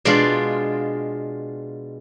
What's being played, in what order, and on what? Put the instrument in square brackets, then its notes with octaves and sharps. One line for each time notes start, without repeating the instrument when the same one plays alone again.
[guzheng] B2 G#3 D4 F4 D5